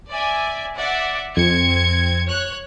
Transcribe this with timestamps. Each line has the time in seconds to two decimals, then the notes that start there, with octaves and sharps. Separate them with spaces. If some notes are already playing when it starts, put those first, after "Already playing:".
0.11 D5 E5 G#5
0.77 D5 E5 F#5
1.37 F2 C4 G#6 C#7
2.26 C#5 F#6